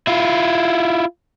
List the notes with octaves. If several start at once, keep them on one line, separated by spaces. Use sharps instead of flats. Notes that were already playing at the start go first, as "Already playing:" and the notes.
E4 F4